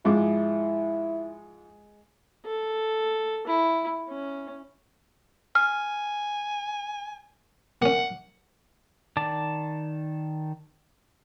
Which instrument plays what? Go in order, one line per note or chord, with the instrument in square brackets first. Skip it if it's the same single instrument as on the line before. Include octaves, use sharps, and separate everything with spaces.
[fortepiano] G#2 F3 D6 [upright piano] G#3 [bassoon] E4
[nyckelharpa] A4
E4
C#4
[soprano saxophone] G#5 [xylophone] F6
[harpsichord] A#3 C#4 [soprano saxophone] F#5
[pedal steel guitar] D#3 D5 A5 D6